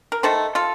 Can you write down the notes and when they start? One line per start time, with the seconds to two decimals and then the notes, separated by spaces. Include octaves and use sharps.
0.12 A#4
0.23 D#3 A3 A4 C5
0.55 F4 A4